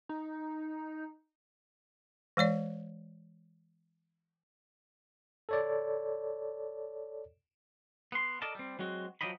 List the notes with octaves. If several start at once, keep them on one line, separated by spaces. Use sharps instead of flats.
D#4
E3 G#3 C#5 D5
A4 C#5 D5
B3 C6
A4 A#4 D5 D#5 A5
G3 C4
F#3 G#3 C4 F#4
F3 F#3 G4 D#5 B5